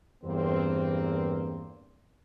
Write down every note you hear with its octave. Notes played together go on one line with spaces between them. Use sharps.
E2 G2 A#3 C4